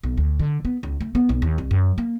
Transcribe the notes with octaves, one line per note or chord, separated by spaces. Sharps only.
B1
D2
D3
B3
C#2
A3
B3
B1
D#2
C2
F#2
A#3